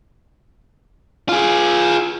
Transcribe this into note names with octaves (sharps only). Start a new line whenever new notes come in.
F4 G#4